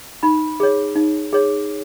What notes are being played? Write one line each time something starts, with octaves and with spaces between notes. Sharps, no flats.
D#4 B5
G#4 C#5
D#4
G#4 C#5